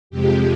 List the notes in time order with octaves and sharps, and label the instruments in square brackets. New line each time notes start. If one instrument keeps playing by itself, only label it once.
[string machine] F2 C3 F3 G#3 G4